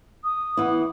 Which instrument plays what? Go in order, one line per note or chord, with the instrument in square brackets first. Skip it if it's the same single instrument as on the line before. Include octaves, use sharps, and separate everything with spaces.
[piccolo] D#6
[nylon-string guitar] E3 B3 E4